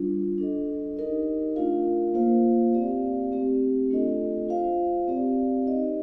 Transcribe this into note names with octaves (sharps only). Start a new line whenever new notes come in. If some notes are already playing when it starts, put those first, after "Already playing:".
Already playing: G3 D4 F4
D4 A4 D#5
D#4 G4 A#4 D#5
A3 D4 F4 A#4 F5
A#3 F4 C5 F5
C4 G4 D5 F5
A3 C4 G4
A3 D4 F4 A4 D#5
F4 C5 F5
C4 G4 D5 F5
D#4 G4 C5 D#5